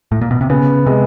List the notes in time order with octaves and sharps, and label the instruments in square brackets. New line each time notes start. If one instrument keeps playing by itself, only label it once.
[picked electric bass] A2
A#2
B2
C3
[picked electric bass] C#3 [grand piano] B3
[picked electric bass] C3 [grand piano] G#3